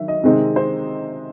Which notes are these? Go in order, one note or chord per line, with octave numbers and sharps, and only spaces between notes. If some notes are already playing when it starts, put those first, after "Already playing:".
Already playing: D#3 F#3 E5
D#5
C3 D#3 G#3 C4 D#4
C5